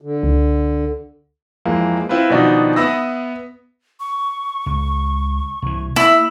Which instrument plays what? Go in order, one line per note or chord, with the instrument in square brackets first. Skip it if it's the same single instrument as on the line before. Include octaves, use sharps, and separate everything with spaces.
[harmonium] D3
[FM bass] C#2
[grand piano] F2 E3 G#3 A#3
C4 E4 F4 B4
B2 D#3 F3 D4 D#4 F#4
B3 E5 B5 D#6 E6 A#6
[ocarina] C#6
[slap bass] C#2
C2 E3
[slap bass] A#3 [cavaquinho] E4 [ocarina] E5